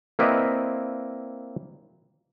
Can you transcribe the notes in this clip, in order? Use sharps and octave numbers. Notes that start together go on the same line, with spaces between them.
A#3 C4 E4 B4 D5 D#5